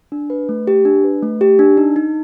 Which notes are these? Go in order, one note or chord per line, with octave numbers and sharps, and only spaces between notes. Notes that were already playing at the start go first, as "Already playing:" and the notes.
D4
B4
A3
G4
D4
B4
A3
G4
D4
D#4
D#4